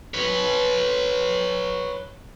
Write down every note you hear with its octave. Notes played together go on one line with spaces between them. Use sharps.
B4 C#5